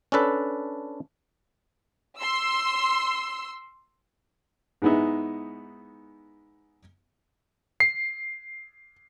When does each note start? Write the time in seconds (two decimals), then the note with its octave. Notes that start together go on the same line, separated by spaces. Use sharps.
0.12 C#4 D4 A4 B4
2.18 C6 E6
4.82 G#2 G#3 B3 D#4 E4
7.80 C7